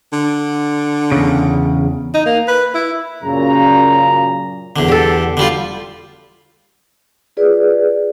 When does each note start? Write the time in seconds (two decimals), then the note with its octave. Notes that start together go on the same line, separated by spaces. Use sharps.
0.13 D3
1.12 E2 C#3
2.14 D#4
2.26 A#3
2.48 B4
2.75 E4
3.23 F#2 A#2 C#3 A#5
4.76 E2 D3
4.88 G4 A4
5.37 D3 G3 F4
7.37 F4 G#4 B4 D5